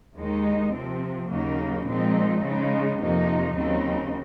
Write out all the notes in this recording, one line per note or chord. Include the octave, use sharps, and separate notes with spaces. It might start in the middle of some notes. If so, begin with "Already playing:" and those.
D#2 D#3 G#3 D#4
C3 F3 C4
D#2 C#3 F#3 A#3 D#4
A#2 F3 G#3 C4 D#4
C#3 G#3 D#4
F2 C3 F3 A#3 D#4
D#2 C#3 F#3 C4 D#4